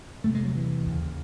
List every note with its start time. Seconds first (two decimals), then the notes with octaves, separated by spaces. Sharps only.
0.24 E2 C3 A3
0.35 G#3
0.45 F#3
0.55 E3
0.86 D#2 C#3